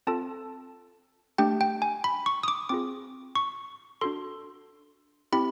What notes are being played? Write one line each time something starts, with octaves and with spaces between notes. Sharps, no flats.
C4 F4 A4 A5
A3 D4 G4 G5
G5
G#5
B5
C#6
D#6
D6
C4 F4 G#4 D6
C#6
D4 F#4 A4 C6
C4 E4 G4 B5